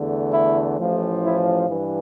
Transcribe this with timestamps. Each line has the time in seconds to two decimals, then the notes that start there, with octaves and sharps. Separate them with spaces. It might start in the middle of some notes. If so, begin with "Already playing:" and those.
Already playing: E2 D3 A3
0.32 E4
0.78 A1 A2 F3
1.24 E4
1.69 G2 E3